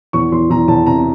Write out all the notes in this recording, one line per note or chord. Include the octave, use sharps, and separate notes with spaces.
E2 C#6
E2 C6
E2 A#5
E2 A5
C3 A#5